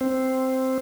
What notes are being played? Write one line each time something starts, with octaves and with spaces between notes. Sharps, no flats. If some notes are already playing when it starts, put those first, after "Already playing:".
C4